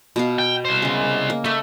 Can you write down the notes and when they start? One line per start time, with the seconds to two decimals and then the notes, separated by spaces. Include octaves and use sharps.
0.16 B2 B3 F5
0.39 G5
0.65 C2 C5
0.82 C#3 G#3
1.30 A#3
1.44 A3 D#5 B5